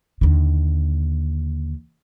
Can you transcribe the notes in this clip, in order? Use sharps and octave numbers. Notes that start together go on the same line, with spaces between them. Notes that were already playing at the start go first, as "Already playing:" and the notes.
D#2 D3